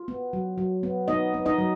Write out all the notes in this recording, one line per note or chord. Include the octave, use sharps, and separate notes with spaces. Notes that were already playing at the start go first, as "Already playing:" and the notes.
Already playing: F4
B3
F#3
F#3
B3
B3 D#4 D#5
B3
D#4 D#5
F#3